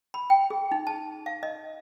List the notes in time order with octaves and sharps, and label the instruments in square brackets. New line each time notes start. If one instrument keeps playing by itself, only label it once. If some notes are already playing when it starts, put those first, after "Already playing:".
[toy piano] B5
G5
G#4
D#4
A5
F5
D#5